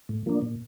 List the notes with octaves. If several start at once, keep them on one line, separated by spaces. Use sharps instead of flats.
A2
F3 A#3 D4
A#2